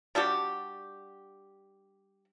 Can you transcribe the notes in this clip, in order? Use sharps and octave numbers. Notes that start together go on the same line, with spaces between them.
G3 D4 F#4 G4